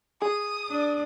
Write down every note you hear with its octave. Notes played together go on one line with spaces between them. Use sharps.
G#4 D#6
D4